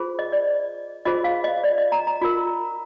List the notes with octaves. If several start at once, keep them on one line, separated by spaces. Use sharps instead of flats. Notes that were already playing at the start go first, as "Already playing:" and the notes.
Already playing: F4 G#4 C5
D#5
D5
F4 G#4 C5 D#5
F5
D#5
D5
D#5
A#5
A#5
F4 A#4